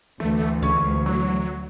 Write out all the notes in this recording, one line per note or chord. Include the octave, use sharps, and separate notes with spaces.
D2 E3 A3
C#2 C#4 C#5
F#3